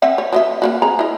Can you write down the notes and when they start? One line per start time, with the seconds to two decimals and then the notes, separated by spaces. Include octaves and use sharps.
0.02 C4 E5 F#5
0.18 C#5
0.33 F#3 D#5 E5
0.62 A#3 B3 F#4
0.82 C4 G#4 A#5
0.99 E4 D#5